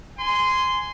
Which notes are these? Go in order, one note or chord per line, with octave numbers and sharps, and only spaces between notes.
G#5 C6